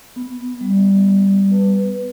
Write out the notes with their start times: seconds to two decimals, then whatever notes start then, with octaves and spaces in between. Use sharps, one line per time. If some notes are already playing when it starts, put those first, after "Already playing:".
0.16 B3
0.61 G3
1.06 B3
1.51 B4